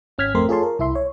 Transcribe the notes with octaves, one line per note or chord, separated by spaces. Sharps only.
G#1 C#4 F6 G#6 B6
F2 A3 C4 A#4 C6
F4 G#4 A4 C#5 A5 C6
A#4
C2 E4 E5 C6
C#5